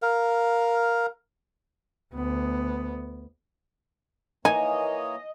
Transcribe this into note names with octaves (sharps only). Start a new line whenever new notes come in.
A#4 F5
D2 B3
E3 A#3 D#4 C#5 D#5 G#5